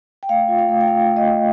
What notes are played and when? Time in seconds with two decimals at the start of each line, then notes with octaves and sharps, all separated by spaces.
0.23 G5
0.29 A3 F5
0.48 F4
0.59 F5
0.69 A3
0.81 G5
0.87 F4 F5
1.06 A3
1.17 D#5
1.26 A3